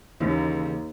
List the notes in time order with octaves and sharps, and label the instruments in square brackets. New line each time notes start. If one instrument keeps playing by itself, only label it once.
[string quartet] D#2 [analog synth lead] C#3 [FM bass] E3 [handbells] A#3 D#4